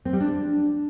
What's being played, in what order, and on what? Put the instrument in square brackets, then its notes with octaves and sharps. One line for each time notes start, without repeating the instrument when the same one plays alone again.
[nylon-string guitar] C4
G3
D4